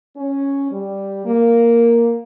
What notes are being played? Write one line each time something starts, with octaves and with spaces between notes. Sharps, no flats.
C#4
G3
A#3